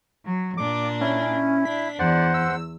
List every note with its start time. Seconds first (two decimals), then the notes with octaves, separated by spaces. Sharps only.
0.25 F#3
0.57 A#2 D4 D6
1.01 C#4 E4
1.65 D4 B6
1.99 E2 C5 D5 F#5
2.34 E6